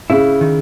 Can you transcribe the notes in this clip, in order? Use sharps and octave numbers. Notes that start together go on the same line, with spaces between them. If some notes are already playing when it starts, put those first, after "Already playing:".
C#3 E4
D#3